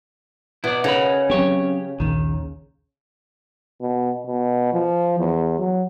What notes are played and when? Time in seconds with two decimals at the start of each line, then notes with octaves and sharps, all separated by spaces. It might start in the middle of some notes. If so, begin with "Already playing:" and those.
0.64 B2 E4 D5
0.84 C#3 D#4 A#4 B4
1.30 F#3 C4 C#4 G4 C#5
2.00 A#1 D#2 D#3
3.81 B2
4.25 B2
4.73 F3
5.19 E2
5.59 F#3